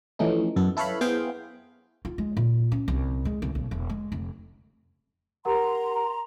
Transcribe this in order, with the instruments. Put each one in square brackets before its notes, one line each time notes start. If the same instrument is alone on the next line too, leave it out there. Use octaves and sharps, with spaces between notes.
[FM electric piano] E3 F3 A3 C#4 D#4
F#2 B3 A4
E4 A4 B4 C#5 F5 B5
B3 E4 G#4 C5 F5 G5
[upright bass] F4
G#3
A#2
C#4
C2
G#3
C2
B1
E1
G#3
F1
[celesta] G4 A#4 F#5 [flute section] A#5 C6